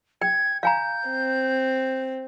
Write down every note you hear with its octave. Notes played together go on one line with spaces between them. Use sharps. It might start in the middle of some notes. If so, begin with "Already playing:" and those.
G5 G#6
F5 G#5 A#5 G6
C4